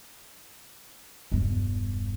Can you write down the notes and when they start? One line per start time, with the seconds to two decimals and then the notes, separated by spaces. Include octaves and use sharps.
1.32 E1 G2